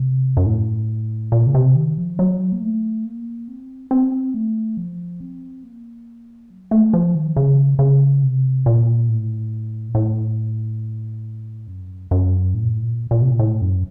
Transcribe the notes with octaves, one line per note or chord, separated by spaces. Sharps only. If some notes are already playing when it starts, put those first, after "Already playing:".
Already playing: C3
F#2
A2
A#2
C#3
C3
D#3
F3
F#3
A#3
A3
A#3
C4
C4
A3
F3
C4
A#3
F#3
A3
F3
D#3
C#3
C#3
C3
A#2
A2
A#2
A2
F#2
F#2
A2
A#2
A2
A#2
A#2
C3
A#2
A2
F#2